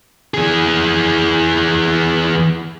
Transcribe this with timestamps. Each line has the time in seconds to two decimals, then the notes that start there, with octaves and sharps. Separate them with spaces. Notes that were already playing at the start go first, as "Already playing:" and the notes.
0.34 E3 G#4